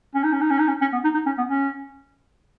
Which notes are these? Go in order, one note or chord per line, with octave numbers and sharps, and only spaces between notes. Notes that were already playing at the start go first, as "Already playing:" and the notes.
C#4
D#4
C#4
D#4
C#4
D#4
C#4
C#4
B3
D#4
D#4
C#4
B3
C#4